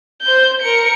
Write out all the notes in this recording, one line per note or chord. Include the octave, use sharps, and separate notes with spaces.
C5 G6
A#4 C#7